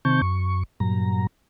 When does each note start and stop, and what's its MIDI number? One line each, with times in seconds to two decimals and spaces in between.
0.05 0.21 48
0.05 0.21 51
0.05 0.21 60
0.05 0.21 81
0.05 0.21 85
0.05 0.21 91
0.22 0.63 42
0.22 0.63 85
0.80 1.27 43
0.80 1.27 46
0.80 1.27 54
0.80 1.27 82